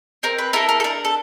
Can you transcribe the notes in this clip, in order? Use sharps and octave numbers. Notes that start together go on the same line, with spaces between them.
C4 A#4
B4
E4 A4 A#4
A#4
A4
D4 A#4
A4